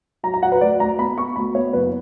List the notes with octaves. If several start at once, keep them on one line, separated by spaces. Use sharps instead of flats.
F#3 A#5
A#5
F#3 F#5
B4
D2 D5
D2 A#5
B3 B5
B3 C#6
D2 B5
B3 C#5
F#1 B4